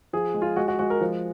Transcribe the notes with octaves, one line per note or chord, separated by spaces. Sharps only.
F3 G#4
G#3
F4
G#3 F#4
F#4
G#3 F#4
A#4
F3